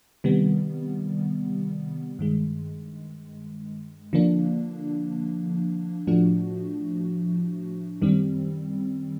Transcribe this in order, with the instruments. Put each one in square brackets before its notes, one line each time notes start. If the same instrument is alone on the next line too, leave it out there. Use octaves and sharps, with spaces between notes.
[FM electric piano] C3 D#3 G3 B3
G2 D#3 G#3
D3 F3 A#3 D4
A2 F3 A3 D4 F#4
F#2 D#3 G3 C4